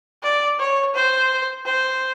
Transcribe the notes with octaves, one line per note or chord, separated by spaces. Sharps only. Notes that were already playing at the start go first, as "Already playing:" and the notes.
D5
C#5
C5
C5